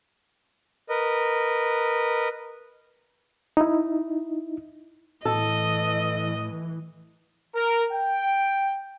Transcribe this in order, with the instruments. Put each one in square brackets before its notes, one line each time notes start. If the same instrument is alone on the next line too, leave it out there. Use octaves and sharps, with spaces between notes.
[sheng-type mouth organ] A#4 B4 D#5
[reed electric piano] D#4 E4
[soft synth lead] A2 [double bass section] E3 [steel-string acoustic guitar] A4 [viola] D#5
[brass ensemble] A#4
G5